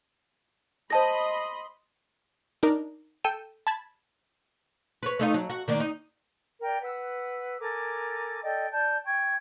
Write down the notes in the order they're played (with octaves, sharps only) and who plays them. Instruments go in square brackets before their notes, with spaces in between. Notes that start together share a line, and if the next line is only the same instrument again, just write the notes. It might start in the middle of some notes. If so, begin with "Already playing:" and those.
[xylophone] C5 A5 A#6 [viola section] D#5 B5 C6
[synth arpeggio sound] D4 D#4 A#4
A4 G5 G6 D#7 E7
A5 B5 G#6
[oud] B4 C#5
A3 D#4 F4
F#3
F#4
D#3 A#3 D4
D#4
[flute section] A#4 D5 G5
B4 F#5 E6
A4 A#4 G#5 D6
A4 D5 D#5 G5
D5 A5 G6
G5 C#6 G#6